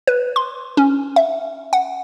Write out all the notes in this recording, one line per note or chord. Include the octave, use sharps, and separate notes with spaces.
B4
C6
C#4
E5
F#5